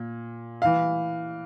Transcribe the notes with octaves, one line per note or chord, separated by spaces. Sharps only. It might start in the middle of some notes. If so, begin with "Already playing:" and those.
Already playing: A#2
E3 F5